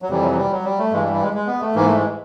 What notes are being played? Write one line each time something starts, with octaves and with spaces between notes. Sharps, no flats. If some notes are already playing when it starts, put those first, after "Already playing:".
F#3
F2 C3 E3 G3
F#3
G3
F#3
G3
A3
G2 E3 G#3
G3
G3
G#3
G#3
B3
A3
G#2 E3 A#3
A3
G#3